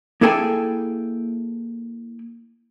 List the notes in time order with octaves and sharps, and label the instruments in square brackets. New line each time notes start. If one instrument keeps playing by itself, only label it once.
[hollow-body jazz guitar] A#3 E4 G#4 A4 G5 G#5